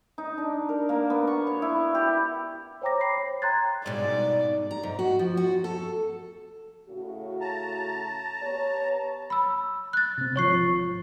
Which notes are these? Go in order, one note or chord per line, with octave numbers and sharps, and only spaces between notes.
D#4
D4
A#4
A#3
B3
C#6
C#5
E4
G4
C5 C#5 G5 A#5 D6 A#6
B5 C7
C#5
G5 A#5 C6 F#6 G#6 A6
G#2 B2 D5
A#5
G#2
F#4
F3
F#4
A4
A2 C#3 F#4
A5 A#5
B3 G4 C#5
B5 E6
F#6 A6
C3 C4
G#1 C3 F3 C#5 C#6 C7